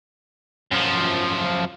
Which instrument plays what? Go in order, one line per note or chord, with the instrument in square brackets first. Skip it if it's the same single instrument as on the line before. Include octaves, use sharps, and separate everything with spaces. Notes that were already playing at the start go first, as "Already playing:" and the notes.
[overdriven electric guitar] F#2 F3